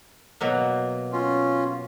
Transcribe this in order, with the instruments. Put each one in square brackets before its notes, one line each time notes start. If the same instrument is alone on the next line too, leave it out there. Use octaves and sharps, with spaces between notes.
[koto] B2 F#3 A#3
[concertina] C#4 F4